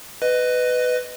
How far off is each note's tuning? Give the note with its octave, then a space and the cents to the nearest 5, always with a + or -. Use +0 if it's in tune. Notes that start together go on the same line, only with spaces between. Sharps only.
B4 +15 D#5 -10